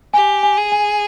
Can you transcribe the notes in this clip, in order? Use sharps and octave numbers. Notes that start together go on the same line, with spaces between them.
G4 G#5
G#5
G#4
G#5